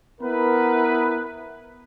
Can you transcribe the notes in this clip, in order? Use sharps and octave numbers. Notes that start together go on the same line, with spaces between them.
B3 E4 A#4 B4